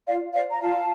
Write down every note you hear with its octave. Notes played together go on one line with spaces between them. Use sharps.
F4 D5 F5
C5 D5 F5
A#5
F4 F5 A5